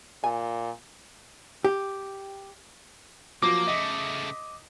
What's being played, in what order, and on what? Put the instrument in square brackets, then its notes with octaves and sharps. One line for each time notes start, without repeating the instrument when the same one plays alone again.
[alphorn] A#2 [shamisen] G#5
[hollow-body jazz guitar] G4
[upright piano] F3 F#3 [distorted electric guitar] A#3 [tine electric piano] D6
[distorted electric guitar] C#3 A3 [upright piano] D#5